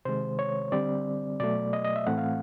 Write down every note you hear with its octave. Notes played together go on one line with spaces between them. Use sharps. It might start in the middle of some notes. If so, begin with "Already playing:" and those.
C3 D#3 G#3 C5
C#5
D3 G3 C4 D5
B2 F#3 A3 D5
D#5
D#5
E5
A2 E3 A3 C4 F#5
F5